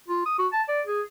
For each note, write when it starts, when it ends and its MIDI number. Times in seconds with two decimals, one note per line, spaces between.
0.08 0.23 65
0.26 0.34 87
0.38 0.47 66
0.53 0.62 81
0.68 0.81 74
0.86 1.02 68